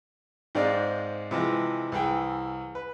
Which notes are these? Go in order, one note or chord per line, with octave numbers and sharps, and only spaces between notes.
G#2 G#3 C4 D5 F5
C3 E3 F3 G#3
C2 E3 G#4 G5
B4